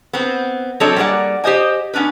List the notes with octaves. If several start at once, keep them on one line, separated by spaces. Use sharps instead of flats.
B3 C4
F#3 C4 D4 A4 C#5 D#5
G3 A#3 G#4 B4 D5 F#5
G4 C5 D#5 G#5
B3 C#4 D4 B4